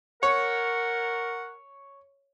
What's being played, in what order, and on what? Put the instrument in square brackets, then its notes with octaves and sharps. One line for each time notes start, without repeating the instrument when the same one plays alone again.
[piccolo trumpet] A#4 [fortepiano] C#5 [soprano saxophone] F#5